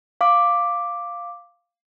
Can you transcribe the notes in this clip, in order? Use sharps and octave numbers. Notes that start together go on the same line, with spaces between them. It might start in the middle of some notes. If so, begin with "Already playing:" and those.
F5 D6